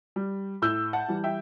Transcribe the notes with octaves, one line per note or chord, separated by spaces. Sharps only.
G3
A2 E6 G6
F#5 A5
E3 G3
E5 G5